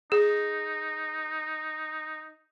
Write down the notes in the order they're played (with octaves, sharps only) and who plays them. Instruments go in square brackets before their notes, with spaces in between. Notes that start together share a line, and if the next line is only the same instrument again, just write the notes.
[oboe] D#4 [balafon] G#4